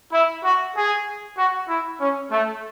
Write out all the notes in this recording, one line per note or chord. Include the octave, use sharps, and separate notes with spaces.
E4
F#4
G#4
F#4
E4
C#4
A3